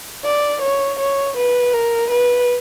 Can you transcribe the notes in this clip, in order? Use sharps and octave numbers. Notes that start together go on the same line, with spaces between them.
D5
C#5
C#5
B4
A#4
B4